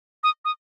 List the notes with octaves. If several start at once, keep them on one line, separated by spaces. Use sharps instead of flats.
D#6
D#6